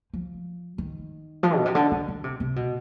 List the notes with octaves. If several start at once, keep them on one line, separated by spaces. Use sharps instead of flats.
F3
D#3
F3
B2
C3
D3
D3
D3
C3
C3
B2